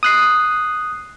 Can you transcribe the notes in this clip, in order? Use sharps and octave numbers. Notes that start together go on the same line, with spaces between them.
D#6 F#6 C7